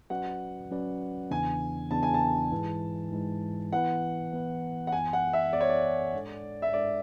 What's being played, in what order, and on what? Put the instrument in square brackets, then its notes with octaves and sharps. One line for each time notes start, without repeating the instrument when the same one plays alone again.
[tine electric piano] F#3 C#4 F#4 B4 D5 [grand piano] F#5
[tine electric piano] F#3 C#4 F#4 B4 D5
[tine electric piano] E2 C#3 E3 B3 D4 [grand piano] G#5
[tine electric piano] E2 C#3 E3 B3 D4 [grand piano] A5
[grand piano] G#5
A5
[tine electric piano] G#2 E3 G#3
G#2 E3 G#3
[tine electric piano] E3 B3 E4 B4 [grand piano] F#5
[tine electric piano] E3 B3 E4 B4
[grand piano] F#5
[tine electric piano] F#2 E3 B3 [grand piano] G#5
[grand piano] F#5
E5
[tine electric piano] F#2 E3 B3 [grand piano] D5
[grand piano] C#5
D5
[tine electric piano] G#2 G#3 D4 A4
[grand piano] E5
[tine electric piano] G#2 G#3 D4 A4 [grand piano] D5